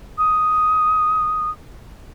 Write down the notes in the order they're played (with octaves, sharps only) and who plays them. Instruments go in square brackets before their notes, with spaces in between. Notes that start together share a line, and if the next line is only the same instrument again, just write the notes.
[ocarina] D#6